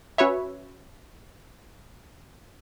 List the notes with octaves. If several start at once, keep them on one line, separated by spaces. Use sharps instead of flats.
C#4 F#4 B4 C#5 E5